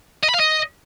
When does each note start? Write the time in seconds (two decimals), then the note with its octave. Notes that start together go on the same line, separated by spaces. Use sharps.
0.24 D#5
0.29 B5
0.34 F5
0.40 D#5